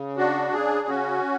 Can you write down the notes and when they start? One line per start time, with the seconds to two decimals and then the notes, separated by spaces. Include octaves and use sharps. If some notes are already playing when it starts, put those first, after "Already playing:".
Already playing: C#3
0.17 D4 F#4
0.53 C#3 G#4
0.88 C#4 F#4